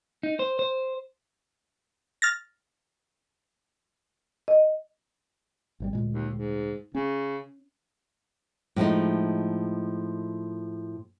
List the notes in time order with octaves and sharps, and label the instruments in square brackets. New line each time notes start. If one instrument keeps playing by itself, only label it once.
[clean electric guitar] D#4
C5
C5
[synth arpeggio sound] F6 A6 A#6
[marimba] D#5
[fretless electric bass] G#1 C3 G3
D2 A#2 G#3
[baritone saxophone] D#2
G#2
[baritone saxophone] C#3 [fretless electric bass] C#4
[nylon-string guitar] A2 F3 G#3 D#4